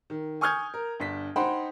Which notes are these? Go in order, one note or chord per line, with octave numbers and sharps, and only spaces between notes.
D#3
G#5 C#6 D#6 F6 G6 G#6
A#4
G1 D4 B6
D#4 C5 F#5 G5 B5 C6